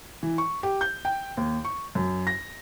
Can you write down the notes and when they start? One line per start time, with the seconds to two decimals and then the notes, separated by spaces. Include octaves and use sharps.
0.23 E3
0.38 C#6
0.63 G4
0.81 G6
1.05 G5
1.37 D#2
1.65 C#6
1.95 F#2
2.27 A#6